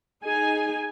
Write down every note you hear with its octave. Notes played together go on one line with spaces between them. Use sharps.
D#4 G#4 G#5